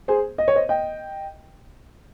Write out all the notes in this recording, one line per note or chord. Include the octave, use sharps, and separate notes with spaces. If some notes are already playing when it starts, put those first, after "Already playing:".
G#4 C5
D#5
C#5
C5 D#5
D#5 G5